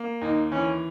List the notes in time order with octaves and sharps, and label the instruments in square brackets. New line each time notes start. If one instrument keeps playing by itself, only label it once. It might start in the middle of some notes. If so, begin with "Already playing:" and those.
Already playing: [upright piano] A#3
[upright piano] D#2 [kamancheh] D#4
[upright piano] E3 [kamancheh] C#4